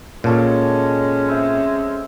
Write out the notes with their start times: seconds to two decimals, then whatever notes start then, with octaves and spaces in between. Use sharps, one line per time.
0.24 A#2 G#3 C#4 G4 A4 C#6
1.28 C4 C5 E5